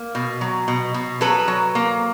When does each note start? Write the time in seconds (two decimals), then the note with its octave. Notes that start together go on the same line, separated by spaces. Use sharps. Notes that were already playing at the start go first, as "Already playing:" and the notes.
Already playing: A#3
0.15 B2
0.41 F#3
0.68 B2
0.94 B2
1.21 F#3 A4 B4
1.48 F#3
1.75 A#3